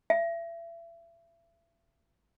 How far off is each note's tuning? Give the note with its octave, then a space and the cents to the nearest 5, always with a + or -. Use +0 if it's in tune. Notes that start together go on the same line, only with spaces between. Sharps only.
E5 +35